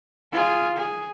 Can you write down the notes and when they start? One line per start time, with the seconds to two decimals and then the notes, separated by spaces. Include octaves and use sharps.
0.33 F4 G#4
0.77 G#4